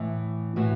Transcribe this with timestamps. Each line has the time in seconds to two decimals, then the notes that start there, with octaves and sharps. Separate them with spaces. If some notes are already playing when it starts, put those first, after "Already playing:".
Already playing: A2 E3
0.56 A2 E3 F#4